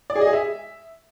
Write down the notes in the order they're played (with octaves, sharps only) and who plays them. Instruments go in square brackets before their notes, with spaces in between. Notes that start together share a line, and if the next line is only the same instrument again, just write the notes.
[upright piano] D5
G#4
D#5
G#4
E5